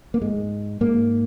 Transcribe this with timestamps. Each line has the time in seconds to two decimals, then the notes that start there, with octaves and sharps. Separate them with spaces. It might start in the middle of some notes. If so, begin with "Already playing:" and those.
0.14 A#3
0.21 G#2 G#3
0.81 G#2 A#3